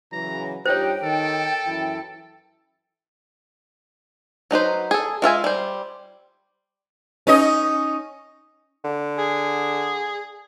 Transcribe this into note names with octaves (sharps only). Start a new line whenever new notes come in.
C#3 E3 F#3 A#5
G2 D#4 F4 G4 C5 C#5 G5
D#3 A4
F#2 E3 E4
F#3 D#4 B4 C5
G#4 A4
G#3 F4 E5 G#5
G3 C5
C#4 D#4 D#5
D3
G#4